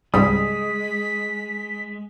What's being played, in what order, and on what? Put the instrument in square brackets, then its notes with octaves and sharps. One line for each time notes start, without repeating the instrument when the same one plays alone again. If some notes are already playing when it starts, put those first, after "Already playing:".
[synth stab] C#2 G#2 G3 [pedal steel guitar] G#3 [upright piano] D#6 [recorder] B6